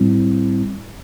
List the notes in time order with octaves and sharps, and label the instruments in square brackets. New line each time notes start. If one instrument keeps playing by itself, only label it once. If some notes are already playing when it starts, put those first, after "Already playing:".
Already playing: [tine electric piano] A2 G3 C4 E4